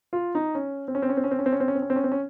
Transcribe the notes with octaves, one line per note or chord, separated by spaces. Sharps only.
F4
D#4
C#4
C4
C#4
C4
C#4
C4
C#4
C4
C#4
C4
C#4
C4
C#4
C4
C#4
C4
C#4
C4
C#4